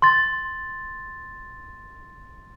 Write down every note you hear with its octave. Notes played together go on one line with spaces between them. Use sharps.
C6 A6